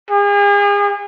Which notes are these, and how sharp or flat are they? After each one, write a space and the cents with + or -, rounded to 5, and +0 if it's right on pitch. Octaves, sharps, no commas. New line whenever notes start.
G#4 -40